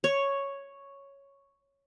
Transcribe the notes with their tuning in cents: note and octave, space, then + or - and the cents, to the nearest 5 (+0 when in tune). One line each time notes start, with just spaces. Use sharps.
C#5 +0